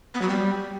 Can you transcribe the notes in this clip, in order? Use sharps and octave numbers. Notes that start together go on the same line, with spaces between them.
B3
F#3
G3